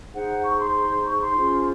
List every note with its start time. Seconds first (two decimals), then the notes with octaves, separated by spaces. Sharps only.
0.14 D#4 G#4 C5 F#5
0.44 C#6
0.59 C6
1.05 C#6
1.20 C6
1.36 C#4 F4 G#4 C5